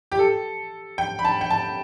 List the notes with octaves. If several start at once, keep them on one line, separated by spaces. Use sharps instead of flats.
G4
A4
G5
B5
A5
G5
A5